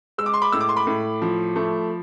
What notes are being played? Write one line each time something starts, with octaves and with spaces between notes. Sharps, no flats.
G#3 E6
D6
C6
B5 D6
A2 E6
D6
C6
B5 D6
A2
F3
A3